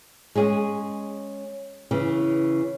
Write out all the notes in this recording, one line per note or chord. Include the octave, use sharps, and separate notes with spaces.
G#3 C#4 G#4
C#3 E3